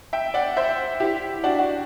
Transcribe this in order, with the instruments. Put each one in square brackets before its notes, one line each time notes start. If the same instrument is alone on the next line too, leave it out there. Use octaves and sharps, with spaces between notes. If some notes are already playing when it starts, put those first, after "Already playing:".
[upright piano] E5 G5
D5 F#5
C5 E5
E4 G4
D4 F#4
D4 F#4